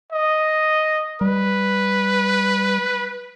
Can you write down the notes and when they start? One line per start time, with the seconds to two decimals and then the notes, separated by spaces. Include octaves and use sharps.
0.12 D#5
1.21 G3 B4